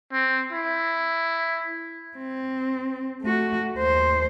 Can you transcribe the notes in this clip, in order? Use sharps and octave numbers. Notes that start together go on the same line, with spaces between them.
C4
E4
C4
A3 F#4
D#2 C5